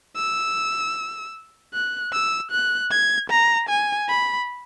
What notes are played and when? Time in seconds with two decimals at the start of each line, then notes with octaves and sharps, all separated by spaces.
0.17 E6
1.74 F#6
2.13 E6
2.52 F#6
2.91 G#6
3.30 A#5
3.69 G#5
4.09 B5